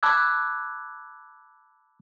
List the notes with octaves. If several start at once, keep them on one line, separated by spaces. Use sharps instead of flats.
A5 B5 D6 E6 F#6 G#6